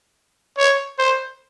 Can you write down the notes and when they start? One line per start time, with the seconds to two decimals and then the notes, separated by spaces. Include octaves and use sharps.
0.58 C#5
0.99 C5